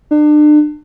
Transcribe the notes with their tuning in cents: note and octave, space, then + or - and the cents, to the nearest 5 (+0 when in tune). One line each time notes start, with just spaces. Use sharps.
D4 +35